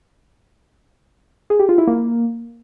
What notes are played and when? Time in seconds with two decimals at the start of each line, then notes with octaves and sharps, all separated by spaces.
1.50 G#4
1.59 G4
1.69 F4
1.78 E4
1.87 A#3